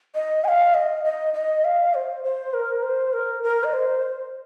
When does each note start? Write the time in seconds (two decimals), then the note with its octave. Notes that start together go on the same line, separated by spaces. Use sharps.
0.15 D#5
0.44 G#5
0.48 F5
0.74 D#5
1.05 D#5
1.34 D#5
1.64 F5
1.94 C5
2.24 C5
2.53 A#4
2.83 C5
3.13 A#4
3.43 A#4
3.64 D#5
3.73 C5